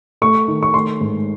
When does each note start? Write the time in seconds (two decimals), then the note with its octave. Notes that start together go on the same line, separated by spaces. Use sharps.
0.22 A3 C#6
0.48 D#3
0.63 C#6
0.74 A3 C6
1.01 G#2